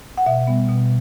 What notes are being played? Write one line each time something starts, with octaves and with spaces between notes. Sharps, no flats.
F#5
B2 E5
G3 B3
B2